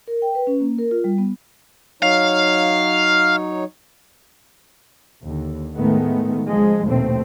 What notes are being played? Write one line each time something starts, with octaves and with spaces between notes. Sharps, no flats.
A#4
G5
B4
C#4
A#3
A#4
F4
G3
B3
F#3 D#4 C#5 F5
D#2 D3
A2 D#3 G#3 A3 B3
C#2 F3 G#3
A#1 D#2 B2 A3 C4